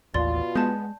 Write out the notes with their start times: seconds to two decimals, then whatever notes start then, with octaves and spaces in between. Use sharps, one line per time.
0.14 A1 D#2 B2 F4 D5 C6 A6
0.56 G#3 B3 A5 G6